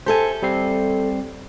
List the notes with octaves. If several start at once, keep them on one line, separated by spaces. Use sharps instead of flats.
G4 A4 C5 E5 G#5
G3 C4 C7